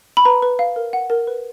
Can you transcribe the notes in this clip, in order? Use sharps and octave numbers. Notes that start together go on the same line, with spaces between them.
B5
B4 A#5
B4
F5
A#4
F#5
A#4
B4